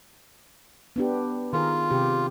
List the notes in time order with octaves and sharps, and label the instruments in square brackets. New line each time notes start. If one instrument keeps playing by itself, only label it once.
[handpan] B3 D4 G4
[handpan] D#3 G#4 A#4 [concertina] F4
[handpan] C3 G4